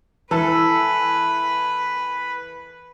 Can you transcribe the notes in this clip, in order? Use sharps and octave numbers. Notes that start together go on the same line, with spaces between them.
E3 A4 B4